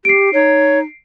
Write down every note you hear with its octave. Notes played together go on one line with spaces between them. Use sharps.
G4 C7 D7
D#4 C#5